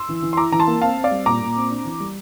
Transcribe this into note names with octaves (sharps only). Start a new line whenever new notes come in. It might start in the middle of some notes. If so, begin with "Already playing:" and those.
Already playing: C6 E6
E3
E3
C6
E4 A#5 D6
E3 A#5
A5 C6
A#3
C4 F5 A5
C4
D5 F5
G3
A#2 A#5 D6
A#2
C4
D4
E3
G3